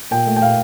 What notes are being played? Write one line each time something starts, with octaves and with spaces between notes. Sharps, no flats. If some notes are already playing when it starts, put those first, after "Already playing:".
A#2 G5
A3
G5
A#2 F5